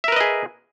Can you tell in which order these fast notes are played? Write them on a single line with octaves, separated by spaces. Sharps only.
E5 A#4 B4 D#5 G#4